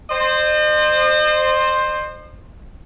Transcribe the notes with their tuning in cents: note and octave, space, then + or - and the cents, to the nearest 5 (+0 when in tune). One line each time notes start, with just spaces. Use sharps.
C5 +5 D#5 -40